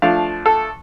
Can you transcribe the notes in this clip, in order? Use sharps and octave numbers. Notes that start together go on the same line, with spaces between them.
F3 A3 D4 F5
A4